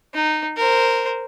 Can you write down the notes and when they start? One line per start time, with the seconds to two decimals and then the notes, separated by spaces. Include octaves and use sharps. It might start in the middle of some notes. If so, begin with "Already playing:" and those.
0.14 D#4
0.57 A#4 C5